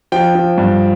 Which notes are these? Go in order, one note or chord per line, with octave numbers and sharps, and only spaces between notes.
F3 G5
F3
G2